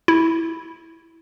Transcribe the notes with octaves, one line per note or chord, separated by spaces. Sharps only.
E4